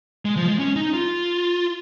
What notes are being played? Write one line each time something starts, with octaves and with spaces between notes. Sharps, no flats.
G#3
F3
G#3
C#4
D#4
F4